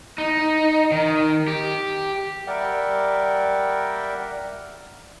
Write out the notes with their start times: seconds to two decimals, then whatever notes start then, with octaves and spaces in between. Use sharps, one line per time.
0.18 D#4
0.91 D#3
1.48 G4
2.47 G3 A#4 D5 E5 F#5 G5